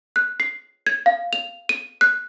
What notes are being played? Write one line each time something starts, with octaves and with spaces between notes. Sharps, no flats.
F#6
C7
G#6
F5
F7
D#7
F#6